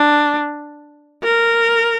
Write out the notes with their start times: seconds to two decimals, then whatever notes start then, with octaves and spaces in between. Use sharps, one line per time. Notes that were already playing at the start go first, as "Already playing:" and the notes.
Already playing: D4
1.24 A#4